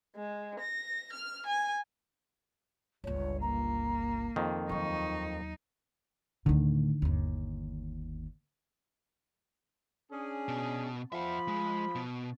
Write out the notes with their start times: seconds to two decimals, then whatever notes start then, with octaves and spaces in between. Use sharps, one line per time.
0.16 G#3
0.60 A#6
1.12 F6
1.45 G#5
3.04 G1 C#2 C#5
3.41 A#3 A#5
4.36 F2 D#3
4.69 D#2 F#3 D#4 C#6
6.46 D2 A2 D3 D#3
7.02 G1 D#2
10.12 C#4 D4 G#4
10.48 B2
11.12 F3 E5 F#5 B5
11.48 G#3
11.95 B2